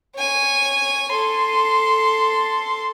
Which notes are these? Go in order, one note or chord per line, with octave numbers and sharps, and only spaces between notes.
C#5 G#5
A4 C6